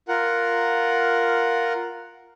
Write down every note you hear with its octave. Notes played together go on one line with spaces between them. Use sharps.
F4 A#4 F#5